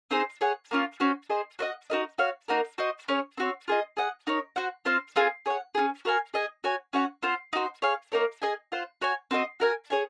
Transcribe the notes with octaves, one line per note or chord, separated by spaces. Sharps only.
C4 D#4 G#4 C5
G#4 C#5 F#5
A#3 C#4 F4
C#4 F#4 C5
G#4 C5 D#5
F#4 C5 D#5 F#5
D#4 F#4 A#4 D#5
F#4 C#5 F5
A#3 D#4 F#4 A#4
F#4 C5 D#5
C#4 G#4 C#5
C4 F#4 C#5
F4 G#4 D#5
G#4 D#5 F#5
D#4 A#4 C#5
F#4 C5 F#5
C4 F4 C5 F5
C4 F4 G#4
G#4 C#5 F#5
C#4 F4 G#4
F#4 A#4 F5 G#5
G#4 D#5 G#5
F#4 C#5 G#5
C#4 F#4 C#5 F#5
C4 F4 C5 F#5
D#4 F#4 C5
G#4 C#5 F5
A#3 D#4 A#4 C#5
G#4 D#5 G#5
F4 C5 F#5
F#4 C#5 G#5
C4 F#4 A#4 D#5
F#4 A#4 F5 G#5
G#4 C#5 G#5